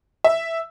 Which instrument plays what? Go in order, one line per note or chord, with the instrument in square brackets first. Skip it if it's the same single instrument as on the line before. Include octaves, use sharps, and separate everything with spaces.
[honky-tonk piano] E5